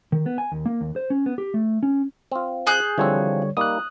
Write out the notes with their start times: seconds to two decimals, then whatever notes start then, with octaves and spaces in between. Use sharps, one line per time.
0.12 D#3
0.26 B3
0.38 G#5
0.52 D#2
0.66 A#3
0.81 D#2
0.96 C5
1.10 C#4
1.26 B3
1.38 G4
1.54 A3
1.83 C#4
2.32 C4 F4
2.67 G#4 F#6 G6
2.98 D3 E3 F3 G3 C4 C#5
3.57 G3 A#3 D#4 D#6 F#6